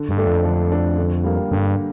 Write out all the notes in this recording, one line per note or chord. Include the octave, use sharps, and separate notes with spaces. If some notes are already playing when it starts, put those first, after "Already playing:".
Already playing: D3
G2
A3 D4 A4
F2
D3
A3 D4 A4
D3
G3 A#3
G2 D3